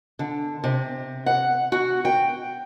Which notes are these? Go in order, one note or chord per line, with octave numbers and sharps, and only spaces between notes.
D3
C3
F#5
F#4
G5